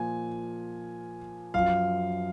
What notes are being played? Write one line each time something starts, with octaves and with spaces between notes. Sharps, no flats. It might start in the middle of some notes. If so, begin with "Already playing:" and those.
Already playing: A#2 F3 G#5
F#2 F3 F5